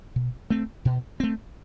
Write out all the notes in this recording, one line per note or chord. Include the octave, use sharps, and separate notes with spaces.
B2
A3 C4
B2
A3 C4